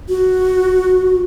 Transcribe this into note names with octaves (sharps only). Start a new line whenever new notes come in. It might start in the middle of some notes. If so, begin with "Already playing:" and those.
F#4